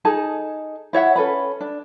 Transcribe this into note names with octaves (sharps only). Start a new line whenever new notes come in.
D#4 G#4 A4 A5
E4 C#5 E5 F#5
C#4 A4 B4 B5
D4